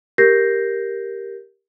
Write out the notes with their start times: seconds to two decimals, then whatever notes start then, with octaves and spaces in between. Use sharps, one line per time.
0.18 G4 A#4 G6 A#6 C7